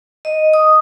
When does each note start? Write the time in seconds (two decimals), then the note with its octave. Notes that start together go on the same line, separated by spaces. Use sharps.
0.25 D#5
0.53 D#6